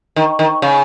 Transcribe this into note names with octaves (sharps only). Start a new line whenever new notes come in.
D#3
D#3
C#3